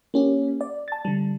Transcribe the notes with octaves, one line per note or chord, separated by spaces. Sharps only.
A#3 C#4 G4
D5
A5 A6
D3 G3